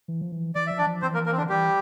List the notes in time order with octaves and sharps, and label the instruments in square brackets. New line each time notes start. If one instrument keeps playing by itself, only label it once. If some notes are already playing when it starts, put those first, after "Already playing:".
[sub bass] E3
F3
E3
[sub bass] E3 [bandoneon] D5
[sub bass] F3 [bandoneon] E5
[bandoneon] D4 D5
[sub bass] F3
[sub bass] E3 [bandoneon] C4 C5
[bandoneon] A#3 A#4
A#3 A#4
C4
D3 D4
[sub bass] E3 [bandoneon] G3 G4